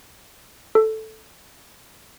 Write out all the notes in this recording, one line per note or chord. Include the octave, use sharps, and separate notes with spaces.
A4